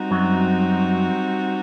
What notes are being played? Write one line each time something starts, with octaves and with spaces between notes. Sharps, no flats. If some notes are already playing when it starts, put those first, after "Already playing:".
Already playing: G3 C4 D#4 F#4
F#2 F#3